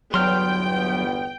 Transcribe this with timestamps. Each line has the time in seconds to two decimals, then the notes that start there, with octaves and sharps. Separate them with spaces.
0.14 G1 E2 F#3 B3 G5 C6 F6